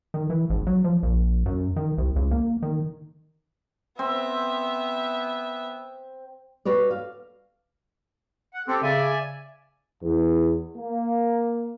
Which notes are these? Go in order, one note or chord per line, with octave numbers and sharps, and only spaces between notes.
D#3
E3
G#1
F#3
F3
A#1
F#2
D#3
C2
C#2
A#3
D#3
B3 C4 E5
F#4 B4 C#5 D5
F5
F#5
C4 G4 A4
C#3 D5 E5 G#5
E2
A#3